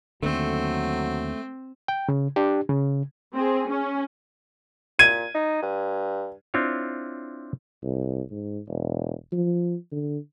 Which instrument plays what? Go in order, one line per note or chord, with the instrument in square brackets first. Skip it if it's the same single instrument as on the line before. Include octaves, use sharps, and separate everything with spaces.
[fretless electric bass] D#2 D3 [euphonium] F#3 [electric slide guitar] A3 [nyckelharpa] C4
[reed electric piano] G5
C#3
D4 G4
C#3
[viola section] C4 G#4
C#4
[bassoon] A#2 [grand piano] G#6 D#7
[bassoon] D#4
G2
[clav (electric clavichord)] C4 D4 E4 F4 C#5
[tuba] C2
G#2
E1
F3
D3